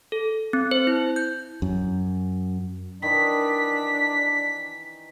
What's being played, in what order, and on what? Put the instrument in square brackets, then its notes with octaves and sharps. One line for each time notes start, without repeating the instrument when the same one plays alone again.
[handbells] A4
C4
C5
E4
G6
[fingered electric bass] F#2
[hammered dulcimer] D#3 E3 [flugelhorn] D4 [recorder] B6